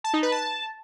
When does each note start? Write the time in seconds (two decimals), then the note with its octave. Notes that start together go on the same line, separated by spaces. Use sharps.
0.04 A5
0.13 D#4
0.23 B4
0.32 A5